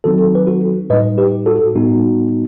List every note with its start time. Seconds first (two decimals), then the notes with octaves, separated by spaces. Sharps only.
0.04 D#3 F#3 C4 D#4 F#4 A4
0.35 B4
0.47 F#4 A4
0.90 A2 G3 D#4 B4 D#5
1.18 G4 B4
1.46 F#4 A4
1.75 A2 G3 B3 D#4 F#4